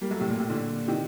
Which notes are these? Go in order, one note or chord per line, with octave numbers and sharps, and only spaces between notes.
G3 A#3
F#3 A3
A2 C3
A#2
A2 C3
A#2 D3
C3 D#3